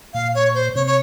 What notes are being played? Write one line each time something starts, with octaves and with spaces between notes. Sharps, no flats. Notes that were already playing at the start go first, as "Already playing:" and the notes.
A#2 F5
C#5
C5
C3 C#5
C#5